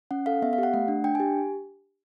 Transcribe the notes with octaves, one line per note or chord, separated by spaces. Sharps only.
C#4 F#5
A4 F5
B3 E5
F5
G4
F#5
A3 F#5
D4
D4 G5
G#5
G4